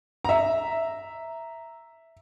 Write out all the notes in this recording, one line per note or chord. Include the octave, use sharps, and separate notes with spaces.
E5 A#5